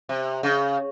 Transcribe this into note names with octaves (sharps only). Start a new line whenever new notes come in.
C3
C#3